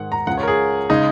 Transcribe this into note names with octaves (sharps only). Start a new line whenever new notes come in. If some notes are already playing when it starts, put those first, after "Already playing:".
Already playing: G#2 D#3 G#3 F#5
A#5
C#2 C#3 G#3 F#5
C#5
A#4
G#4
C#3 G#3 D#4